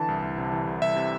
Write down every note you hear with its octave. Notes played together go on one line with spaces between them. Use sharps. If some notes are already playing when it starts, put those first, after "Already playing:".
Already playing: D3 E3 A5
C2
C2
C3
E3
C2
C2 E5
C3